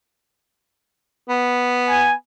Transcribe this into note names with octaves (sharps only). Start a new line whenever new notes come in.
B3
G#5